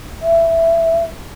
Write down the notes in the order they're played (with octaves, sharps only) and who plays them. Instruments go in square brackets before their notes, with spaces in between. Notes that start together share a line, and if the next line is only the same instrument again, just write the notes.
[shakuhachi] E5